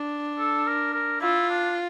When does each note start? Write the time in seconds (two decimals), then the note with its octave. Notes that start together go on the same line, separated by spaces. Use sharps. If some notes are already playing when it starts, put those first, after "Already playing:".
Already playing: D4
0.39 A4
0.67 A#4
0.94 A#4
1.21 E4 F4
1.50 D4